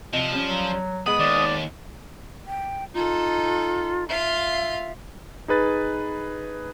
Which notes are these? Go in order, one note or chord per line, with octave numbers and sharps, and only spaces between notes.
C3 F3 D#5
G3 C#4
F#3
G#3 B3 B5 D#6
D#2 D5
G5
D#4 F4 A4
F4 E5 F5
D#4 G#4 B4 A6